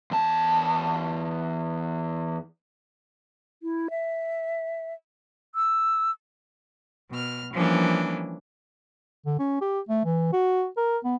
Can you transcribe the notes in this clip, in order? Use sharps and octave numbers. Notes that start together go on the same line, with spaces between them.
E2 A5
E4
E5
E6
B2 F6
E3 F3 G3 A#3 C#4 D4
D3
C#4
G4
A3
E3
F#4
A#4
B3